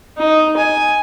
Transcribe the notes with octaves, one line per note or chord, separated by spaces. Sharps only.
D#4
G#5